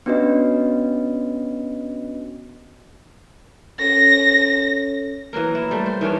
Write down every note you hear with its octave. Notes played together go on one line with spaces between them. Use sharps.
B3 C#4 D4 F#4 B4 D#5
C#4 A4 C#5 A#6
E3 F#3 A#3 A#4
E4
G3 A3
C5
D#3 E3 C#4 D4